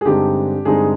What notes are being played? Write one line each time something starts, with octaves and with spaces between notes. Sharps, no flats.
G#4
G2 D3 G#3 C4 D#4 G4
G2 D3 G#3 C4 D#4 G#4